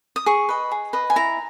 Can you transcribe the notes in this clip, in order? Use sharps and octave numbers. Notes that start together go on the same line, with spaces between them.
D#6
G#4 C#6
B4 D#5
G#4
B4 D#5
G#5
E4 A#5